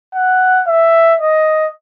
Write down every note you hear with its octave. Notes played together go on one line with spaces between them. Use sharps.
F#5
E5
D#5